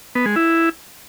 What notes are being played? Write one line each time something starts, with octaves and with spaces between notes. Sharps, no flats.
B3
G#3
E4